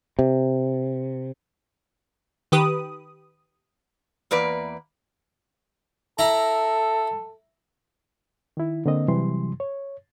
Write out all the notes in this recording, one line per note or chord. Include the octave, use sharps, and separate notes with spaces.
C3
D#3 G4 B4 D#6
E2 A#3 B4 D5
E4 A4 A#5
D#3 E4
D3 A#3 C4 D#5
C3 E3 F#3 G3 C6
C#5